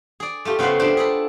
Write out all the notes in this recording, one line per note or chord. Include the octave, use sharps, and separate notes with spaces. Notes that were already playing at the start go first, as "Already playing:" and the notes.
G#4 D5
A3 F4 G4
C#3 B3 F4 C5 F#5
D4 G4 C5
G#4 A4 B5